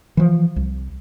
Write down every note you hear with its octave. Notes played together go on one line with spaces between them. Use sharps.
E3 F3
C2